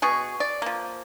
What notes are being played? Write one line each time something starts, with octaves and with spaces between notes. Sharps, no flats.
B2 G#4 C#6
D5
F3 A#3